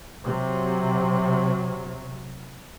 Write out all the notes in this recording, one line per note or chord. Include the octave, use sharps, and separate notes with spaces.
C3 F#3